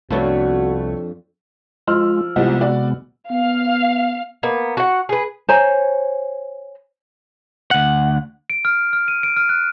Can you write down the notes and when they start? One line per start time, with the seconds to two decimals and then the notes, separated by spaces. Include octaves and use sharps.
0.11 C2 F2 A3 B3 D4 F#4 B4 C#5
1.88 F3 G#3 F4 E6 F6
2.36 C2 C3 F3 G#3 B3 G4
2.61 F#4 D5
3.31 B3 F5
4.43 A#3 B3
4.77 F#4 F#5
5.09 G#4 B4
5.49 C5 C#5 G#5 A#5
7.71 D2 F#5
8.50 D7
8.65 F6
8.93 F6
9.08 D#7
9.23 D7
9.37 F6
9.49 F#6